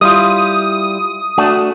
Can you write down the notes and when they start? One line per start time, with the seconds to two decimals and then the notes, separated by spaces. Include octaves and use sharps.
0.01 G3 E4 F4 D#6
1.38 A3 D4 F#4